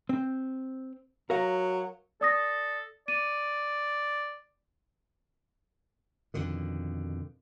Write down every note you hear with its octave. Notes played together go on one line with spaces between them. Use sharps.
C4
F#3 A#4 F5
A4 D5 D#6 A#6
D5 D#7
F2 B2 D3 D#3